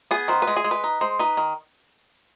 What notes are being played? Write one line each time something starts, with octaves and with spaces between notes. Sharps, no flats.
B3 G#4
D#3 C5
B4
G#3
G#4
G#3
B4
D#4
G#3 C5
D#4 B4
D#3